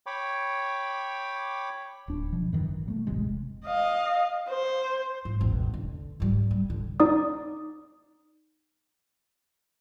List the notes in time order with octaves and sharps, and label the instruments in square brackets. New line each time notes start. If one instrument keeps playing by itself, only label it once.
[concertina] C#5 G5 B5 D6
[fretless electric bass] D1 D4
B2 F3
F#2 D#3 E3
G#1
B2 G3 A3
E1 A1 C3 G#3
[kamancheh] D#5 F5
C5
[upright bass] G#2
E1 A1
D3
G#2 G3
G3
D3
[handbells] D#4 D5 D#6